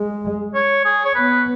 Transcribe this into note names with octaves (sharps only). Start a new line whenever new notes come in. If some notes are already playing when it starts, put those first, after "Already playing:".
Already playing: G#3
C#5
G#4
C#5
B3 B4